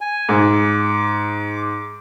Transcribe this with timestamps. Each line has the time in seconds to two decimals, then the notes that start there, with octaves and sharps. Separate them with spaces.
0.01 G#5
0.29 G#2 D6